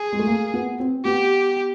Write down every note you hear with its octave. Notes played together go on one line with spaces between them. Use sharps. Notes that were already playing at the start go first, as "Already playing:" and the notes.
Already playing: G#4
G#3
A3
A#3
B3
C4
B3 G4